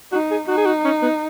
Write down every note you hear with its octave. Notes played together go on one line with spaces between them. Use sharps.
D#4 F#4
G#4
D#4 F#4
G#4
F#4
C#4
B3